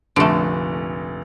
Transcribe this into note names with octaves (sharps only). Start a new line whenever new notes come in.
F1 A#1 D3 A3 D7